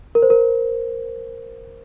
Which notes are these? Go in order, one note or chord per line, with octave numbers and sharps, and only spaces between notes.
A#4
C5
A#4